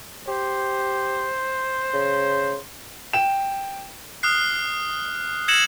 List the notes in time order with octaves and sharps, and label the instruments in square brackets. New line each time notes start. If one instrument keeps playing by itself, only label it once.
[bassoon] G4 [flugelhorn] C5
[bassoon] C#3
[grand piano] G5 E7
[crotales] D#6 F6 F#6 C7
E6 G#6 A#6 C#7 E7 F#7